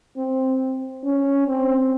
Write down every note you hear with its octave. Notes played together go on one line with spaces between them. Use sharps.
C4
C#4
C4